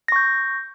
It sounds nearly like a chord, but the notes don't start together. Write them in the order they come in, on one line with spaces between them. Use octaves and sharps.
A#6 C#6 G6